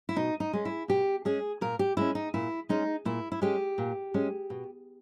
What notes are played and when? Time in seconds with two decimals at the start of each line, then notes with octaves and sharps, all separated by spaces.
0.09 E4
0.16 B2 D#4
0.40 D#4
0.53 G#3 C#4
0.65 E4
0.88 B2 G4
1.25 G#3 C#4 G#4
1.61 A#2 A#4
1.79 G4
1.97 G#3 C#4 E4
2.15 D#4
2.34 A#2 E4
2.69 G#3 C#4 D#4
3.05 A#2 E4
3.32 E4
3.42 G#3 C#4 G4
3.78 A#2
4.14 G#3 C#4
4.50 B2